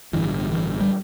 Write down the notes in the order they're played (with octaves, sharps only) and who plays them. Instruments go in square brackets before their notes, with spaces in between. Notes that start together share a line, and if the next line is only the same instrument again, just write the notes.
[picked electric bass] A1 G2 D3 E3
E3
G3